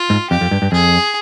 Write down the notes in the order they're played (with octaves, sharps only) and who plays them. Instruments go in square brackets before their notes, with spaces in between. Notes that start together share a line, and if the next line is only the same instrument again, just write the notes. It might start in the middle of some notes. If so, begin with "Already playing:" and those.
Already playing: [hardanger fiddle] F4
[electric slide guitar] G#2
[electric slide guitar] F2 [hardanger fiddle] G4
[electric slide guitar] F2
G2
G2
[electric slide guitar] F2 [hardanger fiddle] G#4